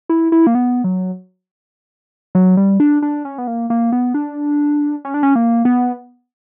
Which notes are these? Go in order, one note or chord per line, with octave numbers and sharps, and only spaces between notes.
E4
E4
A#3
B3
F#3
F#3
G3
D4
D4
C#4
B3
A#3
A#3
B3
D4
C#4
D4
C#4
A#3
B3